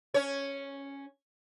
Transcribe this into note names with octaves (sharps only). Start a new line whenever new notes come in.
C#4 C#5